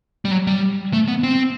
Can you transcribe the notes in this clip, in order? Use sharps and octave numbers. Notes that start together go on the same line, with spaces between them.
G3
F#3
G3
A3
B3
C4